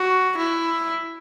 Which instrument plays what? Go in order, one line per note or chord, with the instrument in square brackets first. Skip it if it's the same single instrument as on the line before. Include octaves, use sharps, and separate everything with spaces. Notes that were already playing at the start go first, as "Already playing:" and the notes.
Already playing: [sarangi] F#4
E4